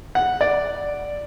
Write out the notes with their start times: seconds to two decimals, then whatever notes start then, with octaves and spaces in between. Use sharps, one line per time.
0.15 F#5
0.41 D5